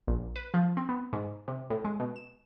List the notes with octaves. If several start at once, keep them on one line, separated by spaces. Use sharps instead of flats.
A#1
B4
F3
C4
B3
G#2
C3
A2
G#3
B2
E7